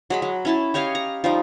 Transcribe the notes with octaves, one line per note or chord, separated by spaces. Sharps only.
F#3 G#3 B5
F#3
C#4 E4 A5
G4 C#5 D#5 F5
A#5
F3 G3 D#4